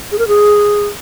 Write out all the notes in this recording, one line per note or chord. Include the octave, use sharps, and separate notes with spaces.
G#4
A#4
G#4